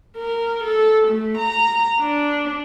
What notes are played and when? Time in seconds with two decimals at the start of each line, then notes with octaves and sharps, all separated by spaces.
0.18 A#4
0.64 A4
1.08 A3
1.38 A#5
2.00 D4